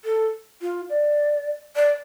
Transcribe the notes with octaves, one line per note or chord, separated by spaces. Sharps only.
A4
F4
D5
D5